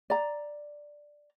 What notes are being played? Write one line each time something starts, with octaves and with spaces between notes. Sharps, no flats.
D5 A#5